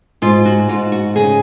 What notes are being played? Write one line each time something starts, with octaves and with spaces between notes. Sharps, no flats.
G#2 F4
F#4
G#2 F4
F#4
C#3 G#4